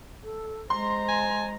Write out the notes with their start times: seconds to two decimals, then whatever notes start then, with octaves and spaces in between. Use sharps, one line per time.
0.23 A4
0.70 G#3 C5 A#5 C6
1.08 G#5